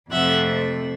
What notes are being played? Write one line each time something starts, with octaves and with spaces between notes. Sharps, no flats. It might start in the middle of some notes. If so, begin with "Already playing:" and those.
F2 C3 F3 A3 E5 F#5